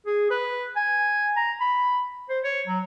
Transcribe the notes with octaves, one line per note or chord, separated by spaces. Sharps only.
G#4
B4
G#5
A#5
B5
C5
C#5
F#3